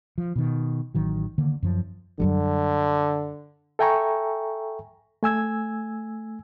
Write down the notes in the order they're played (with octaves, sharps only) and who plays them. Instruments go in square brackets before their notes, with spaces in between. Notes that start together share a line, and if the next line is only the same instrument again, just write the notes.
[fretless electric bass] F3
B2 D#3
A1 D#3 F#3
D3 D#3 A#3
F#2 F3
[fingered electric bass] F#2 F#3 G3 [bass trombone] D3
[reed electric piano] A4 E5 G5 G#5 A#5 C#6
A3 G#5 E6 G#6